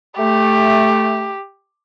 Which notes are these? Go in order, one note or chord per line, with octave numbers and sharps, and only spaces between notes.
A3 G4